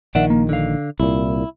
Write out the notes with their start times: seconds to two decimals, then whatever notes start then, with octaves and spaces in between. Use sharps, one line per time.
0.15 A#1 D#3 D5 E5 F#5
0.30 A#3
0.49 D3 F5
1.00 C2 A#2 E4